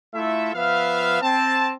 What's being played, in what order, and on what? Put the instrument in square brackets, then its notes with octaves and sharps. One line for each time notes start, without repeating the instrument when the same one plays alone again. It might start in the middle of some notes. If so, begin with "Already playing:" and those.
[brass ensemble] A3 E4 F4 A4 E5
F3 B3 B4 E5 F5
C4 A5